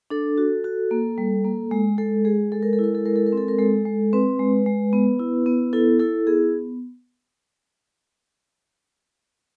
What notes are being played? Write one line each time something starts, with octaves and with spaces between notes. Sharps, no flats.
D4 A4
F#4
F#4
A#3
G3
A#3
G#3
G#3 A4
G#3 G#4
G#3 A4
A#4
A4
E4
A#4
A4
G#3 A#4
A4
A#4
C4 A4
A#4
G#3 A4
G#3
C4 B4
G#3
G#3
B3
E4
B3
E4 A4
E4 A4
B3 G#4